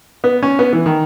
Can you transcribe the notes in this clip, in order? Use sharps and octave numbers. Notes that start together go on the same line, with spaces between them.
B3
C#4
B3
E3
D#3